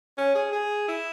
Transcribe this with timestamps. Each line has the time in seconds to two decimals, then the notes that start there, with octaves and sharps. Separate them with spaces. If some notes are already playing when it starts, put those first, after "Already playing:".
0.18 C#4
0.35 G#4
0.53 G#4
0.88 E4